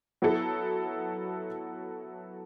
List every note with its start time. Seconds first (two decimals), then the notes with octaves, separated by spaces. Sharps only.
0.22 F#3 B3 E4 A4